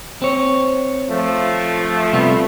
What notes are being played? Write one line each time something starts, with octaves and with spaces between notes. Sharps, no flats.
C4 C#5
F3 A3
C3 G3 B3